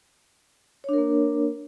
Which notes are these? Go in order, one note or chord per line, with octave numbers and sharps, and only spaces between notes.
A#3 D4 A#4 C#5